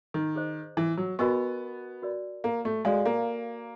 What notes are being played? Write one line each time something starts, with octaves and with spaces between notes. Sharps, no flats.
D#3
G#4 C5 D#5
E3
F#3
B3 F#4 A#4 D#5 G#5 C#6
F#4 A#4 D5
A#3
A3
G#3 F#4 A4 D5 F5 G#5
A#3